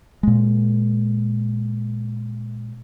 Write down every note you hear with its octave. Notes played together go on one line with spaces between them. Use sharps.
A#2 G#3